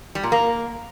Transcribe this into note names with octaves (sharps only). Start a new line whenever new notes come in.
G3
A#2
A#3